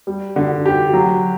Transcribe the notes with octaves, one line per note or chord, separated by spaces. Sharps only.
G3
D3
G4
F#3